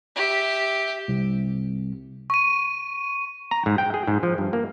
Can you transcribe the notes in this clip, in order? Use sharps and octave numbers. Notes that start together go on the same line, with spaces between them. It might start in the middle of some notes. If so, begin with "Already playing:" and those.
G4 E5
C2
C#6 D#7
A#5
G#2
G5
G#4
G#2
F3
G2
A#3